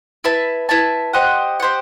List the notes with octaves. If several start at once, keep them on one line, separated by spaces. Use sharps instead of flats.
E4 B4 E5 A5
E4 B4 E5 A5
G4 C5 D#5 F#5
G4 C5 D#5 F#5